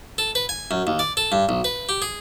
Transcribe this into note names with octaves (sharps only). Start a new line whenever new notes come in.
A4
B4
G#5
F#2
D#2
D5
A4
G2
B1
B4
G4
G#4